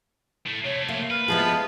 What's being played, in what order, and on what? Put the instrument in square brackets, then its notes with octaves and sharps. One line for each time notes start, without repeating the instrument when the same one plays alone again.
[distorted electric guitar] A2 A3
[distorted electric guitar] C3 A3 [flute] C#5
[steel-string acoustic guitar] A#3 [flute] E5
[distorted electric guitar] B4 [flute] F6
[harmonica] F3 B3 [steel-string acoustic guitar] G#3 E4 G#4 [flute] A5